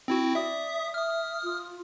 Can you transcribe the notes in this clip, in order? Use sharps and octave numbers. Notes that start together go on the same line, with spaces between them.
C4 E4 F#4
D5 E5 D#6
E5 D#6 F6
F4